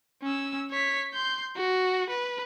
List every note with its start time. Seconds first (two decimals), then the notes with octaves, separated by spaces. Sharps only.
0.22 C#4 E6
0.71 C#5 B6
1.14 C6 G6
1.56 F#4
2.10 B4